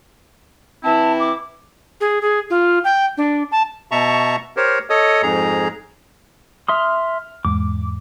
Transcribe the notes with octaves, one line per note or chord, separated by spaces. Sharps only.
E3 C4 E4 A5
D6
G#4
G#4
F4
G5
D4
A5
B2 E5 A5 A#5 C#6
G4 A#4 C5 C#5
A4 C#5 D#5 D#6
F2 G#2 G#4 A#5
E5 C6 D#6 F6
E2 G#2 D6